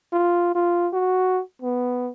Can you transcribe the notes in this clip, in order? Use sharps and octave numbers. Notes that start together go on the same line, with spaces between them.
F4
F4
F#4
B3